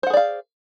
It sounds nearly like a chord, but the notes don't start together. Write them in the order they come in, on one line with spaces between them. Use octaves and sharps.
C5 F#5 G#4 D5 F5